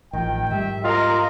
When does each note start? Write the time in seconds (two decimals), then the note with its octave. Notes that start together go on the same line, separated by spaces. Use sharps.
0.13 A1 D#3 F3 G5
0.51 G#2 G3 E5
0.84 F4 A#4 D#5 A#5